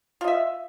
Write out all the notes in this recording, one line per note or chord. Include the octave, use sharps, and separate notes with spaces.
F4 D#5 E5